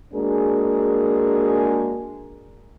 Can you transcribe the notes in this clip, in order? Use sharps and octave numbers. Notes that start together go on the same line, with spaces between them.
G#3 A#3 D4 F#4 G#4 A#4